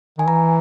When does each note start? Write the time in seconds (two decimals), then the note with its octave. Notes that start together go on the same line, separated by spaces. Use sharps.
0.18 D#3 G#5
0.28 E3 A#5